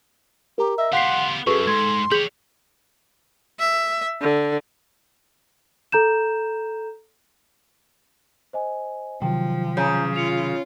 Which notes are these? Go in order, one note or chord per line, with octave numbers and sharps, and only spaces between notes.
G4 A#4 A#5
D#5 E5
B3 G4 F5 F#5 C6 B6 C7
F#2 F#4 G#4 A4 B4 C#6
G#2 C6 G#6
G4 G#4 C#5 G6 F#7
E5
D3
A4 A#5 G6 E7
C5 D#5 G#5
C3 D#3 F3 F#3 G5
C#3 G#5 A#5 G6
F4 C#7 F7